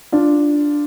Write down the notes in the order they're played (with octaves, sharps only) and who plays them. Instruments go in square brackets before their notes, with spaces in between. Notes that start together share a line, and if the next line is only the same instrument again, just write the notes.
[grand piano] D4 F4